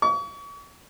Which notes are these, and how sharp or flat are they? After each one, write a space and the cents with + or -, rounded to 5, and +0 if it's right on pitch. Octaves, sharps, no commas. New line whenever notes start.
C#6 +40